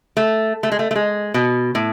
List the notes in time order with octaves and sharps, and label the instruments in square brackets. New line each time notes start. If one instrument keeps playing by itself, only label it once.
[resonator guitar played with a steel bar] A3
A3
G#3
A3
A3
G#3
B2
A2